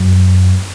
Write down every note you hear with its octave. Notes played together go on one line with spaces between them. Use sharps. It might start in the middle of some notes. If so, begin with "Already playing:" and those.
Already playing: F#2